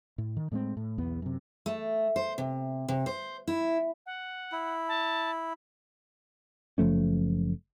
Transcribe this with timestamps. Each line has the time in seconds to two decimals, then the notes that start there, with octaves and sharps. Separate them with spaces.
0.18 A2
0.37 D#3
0.52 A2 G#3 A#3 C4
0.77 A2
0.98 B1 E2 B3
1.22 F#2 C3
1.66 A3
2.16 C5
2.38 C3
2.88 C3
3.06 C5
3.48 E4
4.06 F#5
4.52 E4
4.88 A5
6.78 F#1 F3 A3 C#4